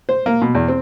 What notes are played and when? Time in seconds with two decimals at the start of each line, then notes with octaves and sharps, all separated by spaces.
0.09 C5
0.26 A#3
0.42 B2
0.55 E2
0.68 C4